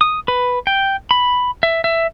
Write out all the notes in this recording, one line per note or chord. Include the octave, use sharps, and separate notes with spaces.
D#6
B4
G5
B5
E5
E5